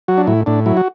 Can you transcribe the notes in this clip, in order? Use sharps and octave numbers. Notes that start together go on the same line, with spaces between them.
F#3 F#4
D4
A2 E4
A2 D4
F#3 E4
F#4